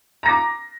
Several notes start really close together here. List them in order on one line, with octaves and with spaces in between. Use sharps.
A#5 A#6 D6